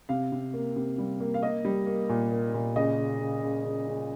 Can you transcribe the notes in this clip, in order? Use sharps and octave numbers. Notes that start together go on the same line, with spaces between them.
C3 F5
C3
A#3
C3
G3
A#3
F5
A#3 D#5
G3
A#3
A#2
A#3
A#2
C#3 D#5
C#3
C#3
C#3
C#3
C#3